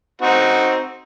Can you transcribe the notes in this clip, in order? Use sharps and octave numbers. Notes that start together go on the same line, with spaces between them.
C4 D#4 F#4